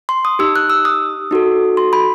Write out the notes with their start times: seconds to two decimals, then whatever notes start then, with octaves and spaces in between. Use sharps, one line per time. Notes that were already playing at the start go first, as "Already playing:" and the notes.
0.09 C6
0.25 D#6
0.39 D#4 G4 E6
0.56 F#6
0.70 E6
0.85 D#6
1.31 D#4 F#4 A4
1.77 C6
1.93 B5